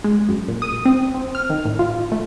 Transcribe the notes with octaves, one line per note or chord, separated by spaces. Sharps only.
G#3
F#2
A#2
D#6
C4
C4
F6
D#3
A2
F4
A3